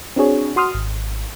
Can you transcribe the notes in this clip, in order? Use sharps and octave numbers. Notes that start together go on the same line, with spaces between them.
C4 D4 F#4 G#4 C#5
F#4 C6 D#6 F6
G#1